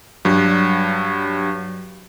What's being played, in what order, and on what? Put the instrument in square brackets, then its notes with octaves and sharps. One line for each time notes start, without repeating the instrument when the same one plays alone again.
[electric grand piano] G2 F#3